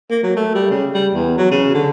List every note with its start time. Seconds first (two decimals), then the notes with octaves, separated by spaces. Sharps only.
0.10 A#3
0.23 F#3
0.36 A3
0.54 G3
0.70 C#3
0.94 G3
1.14 E2
1.37 F#3
1.51 C#3
1.74 D3